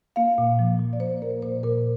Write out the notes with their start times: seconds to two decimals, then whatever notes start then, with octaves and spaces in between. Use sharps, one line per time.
0.16 A#3 F5
0.38 A#2
0.59 F3
0.79 A#2
0.93 D5
1.00 A#3 C5
1.22 A#3 A#4
1.42 A#2 C5
1.63 A#2 A#4